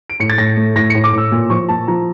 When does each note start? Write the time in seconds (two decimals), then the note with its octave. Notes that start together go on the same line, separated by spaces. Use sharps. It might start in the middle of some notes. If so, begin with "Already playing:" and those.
0.10 D7
0.20 A2 C#7
0.30 A6
0.38 A2 A#6
0.57 A3
0.76 A2 A#6
0.90 C#7
0.95 A2
1.04 D6
1.13 A2 E6
1.32 A#2
1.50 F3 C#6
1.69 A#2 A5
1.88 F3 A#5